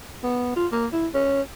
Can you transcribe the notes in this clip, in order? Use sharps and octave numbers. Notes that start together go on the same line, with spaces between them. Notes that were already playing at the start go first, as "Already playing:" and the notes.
B3
F4
A#3
E4
C#4